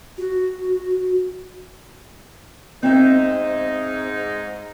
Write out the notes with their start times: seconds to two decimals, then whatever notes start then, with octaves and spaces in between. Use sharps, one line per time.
0.18 F#4
2.83 G#2 C4 D#4 E5